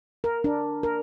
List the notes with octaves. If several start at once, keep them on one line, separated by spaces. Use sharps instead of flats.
A#4
D4
A#4